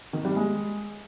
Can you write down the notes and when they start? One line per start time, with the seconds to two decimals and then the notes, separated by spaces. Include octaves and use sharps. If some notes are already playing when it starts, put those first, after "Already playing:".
0.13 D#3
0.25 G3
0.36 G#3